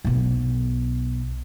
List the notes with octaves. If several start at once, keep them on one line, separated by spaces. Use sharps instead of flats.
B1 B3